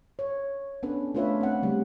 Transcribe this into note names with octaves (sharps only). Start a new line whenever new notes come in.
C#5
B3 C#4 D4 A4 B4
A3 D4 F4 B4 C#5 E5
C4 F#5
C#3 G3 A3